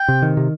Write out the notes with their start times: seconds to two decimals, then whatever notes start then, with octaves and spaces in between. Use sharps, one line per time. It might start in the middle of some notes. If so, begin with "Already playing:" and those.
Already playing: G5
0.08 C3
0.22 D#3
0.37 C3